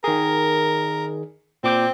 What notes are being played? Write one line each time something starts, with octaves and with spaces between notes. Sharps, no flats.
D#3 G#4 A#4
A#2 C4 D6 G6